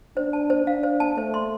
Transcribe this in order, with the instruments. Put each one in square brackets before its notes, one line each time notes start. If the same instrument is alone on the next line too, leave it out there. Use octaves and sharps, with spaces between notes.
[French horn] D4 [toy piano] C5
[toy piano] A5
C5
[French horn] D4 [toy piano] F5
[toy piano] C5
A5
[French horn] A3 [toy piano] C5
[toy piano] C6